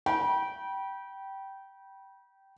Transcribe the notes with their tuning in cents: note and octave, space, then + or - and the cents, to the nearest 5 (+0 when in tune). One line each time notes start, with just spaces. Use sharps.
G5 -15 B5 -30